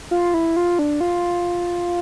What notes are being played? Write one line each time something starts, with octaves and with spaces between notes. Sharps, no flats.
F4
E4
F4
D4
F4